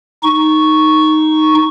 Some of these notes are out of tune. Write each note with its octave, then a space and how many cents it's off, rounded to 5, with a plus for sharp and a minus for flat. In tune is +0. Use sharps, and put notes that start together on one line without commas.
D#4 +0 C#6 +0